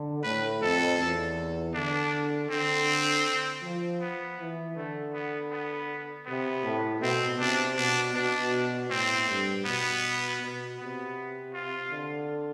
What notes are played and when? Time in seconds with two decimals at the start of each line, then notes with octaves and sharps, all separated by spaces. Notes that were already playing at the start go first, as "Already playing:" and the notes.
Already playing: D3
0.23 A2 B4
0.61 F2 A4
0.99 E2
1.74 D3 D4
2.50 D3 C4
3.63 F3
4.01 B3
4.39 E3
4.75 D3 A3
5.13 B3
5.51 B3
6.26 C3 B3
6.64 A2
7.01 B2 C4
7.39 C3 D4
7.77 B2 D4
8.15 B2 D4
8.90 A2 C4
9.28 G2
9.65 B2 B3
10.41 B2
10.79 C3 B3
11.54 F4
11.91 D3